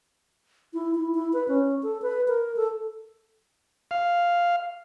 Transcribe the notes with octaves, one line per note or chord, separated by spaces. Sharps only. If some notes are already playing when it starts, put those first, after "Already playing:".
E4
E4
E4
B4
C#4
A4
B4
A#4
A4
F5